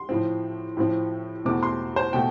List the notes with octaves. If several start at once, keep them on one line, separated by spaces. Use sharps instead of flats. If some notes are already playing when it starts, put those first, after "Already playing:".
Already playing: C6
A2 F3 C4
A2 F3 C4
E2 B2 A3 C4 D6
C6
C5
B2 A3 G5